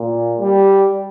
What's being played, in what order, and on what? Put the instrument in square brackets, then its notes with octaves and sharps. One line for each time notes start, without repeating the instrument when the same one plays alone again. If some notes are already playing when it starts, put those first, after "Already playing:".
Already playing: [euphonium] A#2
G3